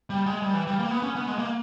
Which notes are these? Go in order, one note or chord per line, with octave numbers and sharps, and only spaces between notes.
G3
G#3
G3
E3
G3
A#3
B3
C#4
B3
G#3
A#3